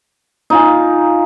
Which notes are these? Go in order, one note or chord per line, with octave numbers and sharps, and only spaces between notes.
D#4 F4 G#5